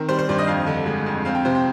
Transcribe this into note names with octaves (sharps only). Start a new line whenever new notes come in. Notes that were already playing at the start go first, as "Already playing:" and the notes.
Already playing: D#3 C4 A#4
G3 C5
C5
G2 D5
D#5
F2 F5
D3
G#3
F2
C4 F5
G5
C3 C5
G5